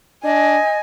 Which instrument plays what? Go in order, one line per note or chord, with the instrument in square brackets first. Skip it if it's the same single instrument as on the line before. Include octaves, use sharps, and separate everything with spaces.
[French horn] D4 [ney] D#5 [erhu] G#5